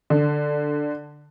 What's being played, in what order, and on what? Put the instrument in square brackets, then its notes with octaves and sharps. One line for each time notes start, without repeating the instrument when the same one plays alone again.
[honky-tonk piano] D3